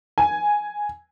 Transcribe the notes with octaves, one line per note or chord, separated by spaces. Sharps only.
G#5